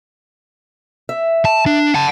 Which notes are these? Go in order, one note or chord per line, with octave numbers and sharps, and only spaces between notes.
E5
A5
D4
F#5 A5